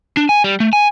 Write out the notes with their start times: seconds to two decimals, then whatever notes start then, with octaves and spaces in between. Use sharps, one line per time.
0.17 D4
0.29 G#5
0.44 G3
0.60 A3
0.73 G#5